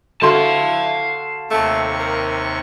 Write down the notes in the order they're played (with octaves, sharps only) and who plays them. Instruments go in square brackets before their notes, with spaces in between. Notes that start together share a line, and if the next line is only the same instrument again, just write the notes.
[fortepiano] D3 F#4 C6 [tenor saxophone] E4 [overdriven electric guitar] F5 A5
[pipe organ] D#2 C3 C#6 [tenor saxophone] A3
[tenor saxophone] A#4